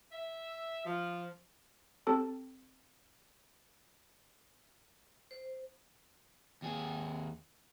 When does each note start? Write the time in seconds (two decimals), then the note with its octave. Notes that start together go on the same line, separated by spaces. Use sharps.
0.12 E5
0.85 F3
2.07 C4 G4 A4 A5
5.31 C5
6.62 D#2 G#4